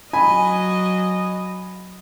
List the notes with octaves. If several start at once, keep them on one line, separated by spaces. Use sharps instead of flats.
F#3 D#5 G#5 B5